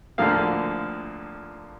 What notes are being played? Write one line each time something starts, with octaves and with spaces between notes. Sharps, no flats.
D2 D3 F3 A#3 F5